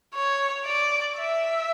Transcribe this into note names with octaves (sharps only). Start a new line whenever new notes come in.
C#5
D5
E5